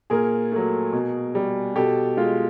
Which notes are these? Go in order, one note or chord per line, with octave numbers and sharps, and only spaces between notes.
A#2 G#4 A#4
F#3 A3
B2
G3
B2 G4 A4
G#3 F4